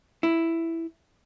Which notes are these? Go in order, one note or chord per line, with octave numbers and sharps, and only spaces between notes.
E4